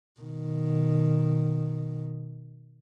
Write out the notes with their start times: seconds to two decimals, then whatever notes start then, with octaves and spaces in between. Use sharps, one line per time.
0.21 B2 D#3